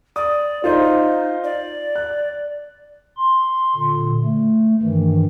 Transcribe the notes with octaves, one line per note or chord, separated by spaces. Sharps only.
D5 D#6
D#4 F4 C5 D#5
D5
F#6
C6
A#2 D3
A3
G2 D#3 E3